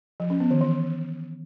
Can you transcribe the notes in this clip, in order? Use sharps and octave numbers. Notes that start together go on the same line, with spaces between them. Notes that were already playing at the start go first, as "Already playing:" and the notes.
F3
C#4
B3
D#3
E3